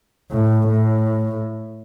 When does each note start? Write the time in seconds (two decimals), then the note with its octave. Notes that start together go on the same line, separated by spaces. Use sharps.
0.31 A2
0.67 A2